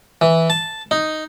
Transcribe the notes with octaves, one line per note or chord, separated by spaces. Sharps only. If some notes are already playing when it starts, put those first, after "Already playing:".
E3
A5
D#4